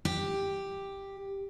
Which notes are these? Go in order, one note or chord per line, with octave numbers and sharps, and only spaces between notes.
G4